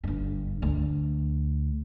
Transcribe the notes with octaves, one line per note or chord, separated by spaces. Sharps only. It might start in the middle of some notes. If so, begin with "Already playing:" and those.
G1 G2
D2